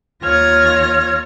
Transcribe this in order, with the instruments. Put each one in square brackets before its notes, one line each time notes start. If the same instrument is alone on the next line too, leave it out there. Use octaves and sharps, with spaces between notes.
[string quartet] D#2 F4 C#5 F6 G#6 A#6